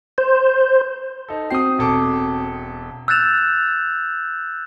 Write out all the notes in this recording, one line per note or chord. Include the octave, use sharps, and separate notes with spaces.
C5
D#4 A4
C4 F#4 G5 D#6 C7
E1 A4 D6
E6 F#6 G6 A6 E7 F7